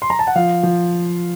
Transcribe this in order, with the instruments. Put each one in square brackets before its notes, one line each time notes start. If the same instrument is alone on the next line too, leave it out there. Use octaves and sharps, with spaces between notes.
[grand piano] C6
A#5
A5
F#5
F3 F5
F3